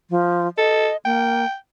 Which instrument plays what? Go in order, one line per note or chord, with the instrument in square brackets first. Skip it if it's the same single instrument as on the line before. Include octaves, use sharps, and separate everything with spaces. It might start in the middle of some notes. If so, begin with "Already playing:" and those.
[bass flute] F3
[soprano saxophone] A4 [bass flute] D#5
[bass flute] A#3 [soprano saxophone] G5